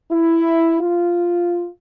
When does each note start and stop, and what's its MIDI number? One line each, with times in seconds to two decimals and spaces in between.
0.11 0.79 64
0.81 1.69 65